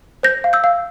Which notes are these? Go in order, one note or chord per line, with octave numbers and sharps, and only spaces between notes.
C5 G6 A#6
F5
E6 G6
F5